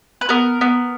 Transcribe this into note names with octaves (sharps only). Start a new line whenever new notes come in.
B4
B3 A#4
B3